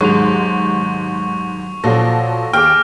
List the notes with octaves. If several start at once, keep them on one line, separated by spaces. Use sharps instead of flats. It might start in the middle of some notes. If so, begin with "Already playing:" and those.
D#2 G#2 F#3 G#3 C#6 F7
A#2 F3 F#3 A4 A#6
D#2 G#4 G5 D6 F6